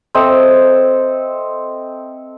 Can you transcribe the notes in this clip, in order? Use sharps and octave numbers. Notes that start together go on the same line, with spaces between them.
C4 A4 D#5 E5